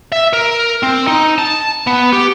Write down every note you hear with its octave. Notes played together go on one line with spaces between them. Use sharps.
E5
A#4
C4
D#4
A5
B3
G4